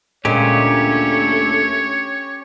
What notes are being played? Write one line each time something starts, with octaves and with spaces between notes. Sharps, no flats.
D2 A#2 G#3 A3 C#4 G4 C#5